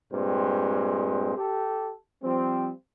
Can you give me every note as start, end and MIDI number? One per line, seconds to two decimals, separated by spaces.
0.11 1.36 43
0.11 1.36 46
0.11 1.36 56
0.11 1.36 60
0.11 1.36 72
1.37 1.93 67
1.37 1.93 69
2.23 2.70 53
2.23 2.70 55
2.23 2.70 60